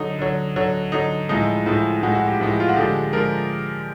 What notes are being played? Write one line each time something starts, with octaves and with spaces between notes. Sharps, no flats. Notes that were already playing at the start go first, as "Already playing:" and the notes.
Already playing: D3 F#3 D#4
D3 F#3
D3 F#3
D3 F#3 D#4
A2 F3 G#3 D#4
A2 F3 G#3
A2 F3 G#3 F#4
F#4
G4
A2 F3 G#3
F4
F#4
D3 F3 G#3 G4
D3 F3 G#3 A#4